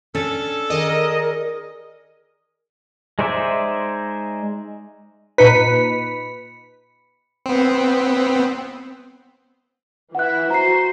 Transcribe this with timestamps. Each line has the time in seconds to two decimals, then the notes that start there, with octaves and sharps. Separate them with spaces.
0.15 C#4 D4 A4
0.70 D#3 G#4 A#4 D5 D#5
3.19 G#3 D#4 C5 D5 E5
5.38 A#2 D#4 B4 B5 B6 C#7
7.46 B3 C4
10.15 E3 E4 F#5 F#6
10.50 F#4 C5 A#5 C7